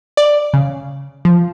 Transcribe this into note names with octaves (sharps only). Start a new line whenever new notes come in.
D5
C#3
F3